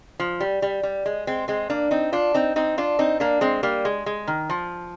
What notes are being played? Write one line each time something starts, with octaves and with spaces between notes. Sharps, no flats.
F3
G3
G3
G3
G#3
G#3 C4
G#3 C4
A#3 D4
C4 D#4
D4 F4
C4 D#4
C4 D#4
D4 F4
C4 D#4
A#3 D4
G#3 C4
G3 A#3
G#3
G#3
D#3
F3